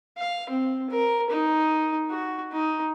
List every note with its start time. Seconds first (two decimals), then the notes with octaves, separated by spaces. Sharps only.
0.18 F5
0.49 C4
0.90 A#4
1.30 D#4
2.10 F#4
2.52 D#4